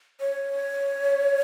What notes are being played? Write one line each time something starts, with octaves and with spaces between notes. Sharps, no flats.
C#5